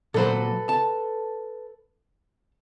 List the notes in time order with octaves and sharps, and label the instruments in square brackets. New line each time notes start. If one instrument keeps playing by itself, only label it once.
[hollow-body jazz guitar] A#2 F#3 C5 [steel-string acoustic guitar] A4 B4
[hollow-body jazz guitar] A5